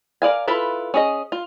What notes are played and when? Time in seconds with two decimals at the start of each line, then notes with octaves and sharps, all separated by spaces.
0.22 A#4 D5 F5 G#5
0.48 E4 F4 A4 B4 B5
0.94 C#4 G#4 D#5
1.32 F4